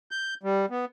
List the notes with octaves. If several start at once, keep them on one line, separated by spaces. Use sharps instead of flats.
G6
G3
B3